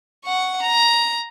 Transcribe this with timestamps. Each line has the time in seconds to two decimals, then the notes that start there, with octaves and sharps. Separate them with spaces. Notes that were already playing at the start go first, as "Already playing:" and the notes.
0.25 F#5 C#6
0.62 A#5